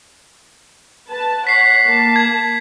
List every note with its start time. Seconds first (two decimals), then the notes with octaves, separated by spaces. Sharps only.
1.08 B4 A5
1.47 C#5 F#5 B6 C7
1.84 A#3 A5
2.16 G#6